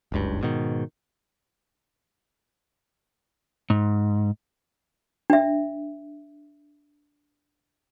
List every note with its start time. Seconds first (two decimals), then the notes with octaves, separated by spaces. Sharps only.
0.12 F#1 C#2 G2
0.41 G#2 B2 D#3
3.70 G#2
5.30 D4 E5